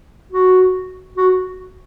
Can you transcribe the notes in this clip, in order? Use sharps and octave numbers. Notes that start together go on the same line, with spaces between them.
F#4
F#4